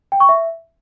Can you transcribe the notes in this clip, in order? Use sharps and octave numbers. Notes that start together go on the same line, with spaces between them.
G5
C#6
E5